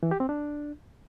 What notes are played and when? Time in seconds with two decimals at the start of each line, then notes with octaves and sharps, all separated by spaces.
0.03 E3
0.11 G4
0.20 C4
0.29 D4